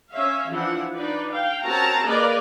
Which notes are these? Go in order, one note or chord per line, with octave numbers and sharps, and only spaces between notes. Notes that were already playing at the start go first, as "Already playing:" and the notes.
C#4 E5 F5
E3 F3 D4 E4 F#5
D4 D#4 B4 D5
F5 G5
C4 C#4 F#4 A#4 A5 A#5
A#3 G#4 A#4 B4 D5 D#5